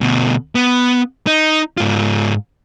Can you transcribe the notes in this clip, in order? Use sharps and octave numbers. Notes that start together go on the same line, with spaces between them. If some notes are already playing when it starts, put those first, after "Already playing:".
D2 B2
B3
D#4
G#2 F4